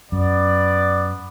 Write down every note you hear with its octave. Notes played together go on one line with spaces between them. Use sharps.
F#2 B3 D5